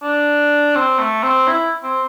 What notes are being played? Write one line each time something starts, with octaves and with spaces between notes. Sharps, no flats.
D4
C4
A3
C4
E4
C4